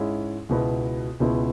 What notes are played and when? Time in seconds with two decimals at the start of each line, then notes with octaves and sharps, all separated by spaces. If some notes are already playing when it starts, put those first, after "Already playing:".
Already playing: G#2 G#3 C#4 E4
0.49 C#2 B2 B3 E4
1.20 C#2 B2 B3 E4